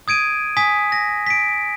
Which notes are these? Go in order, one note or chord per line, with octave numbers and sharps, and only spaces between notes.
D#6 G#6 D7 D#7
G#5 D#6 B6
A#6
B6 D7